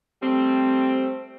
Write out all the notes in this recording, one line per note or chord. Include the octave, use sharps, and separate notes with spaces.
G3 A3 C4